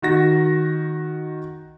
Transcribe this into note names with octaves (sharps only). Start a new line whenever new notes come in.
D#3 F#4 A#6